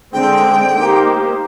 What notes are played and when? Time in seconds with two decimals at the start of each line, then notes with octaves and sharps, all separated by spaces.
0.13 D3 G#3 C4 G5
0.76 A#3 D#4 G4 C5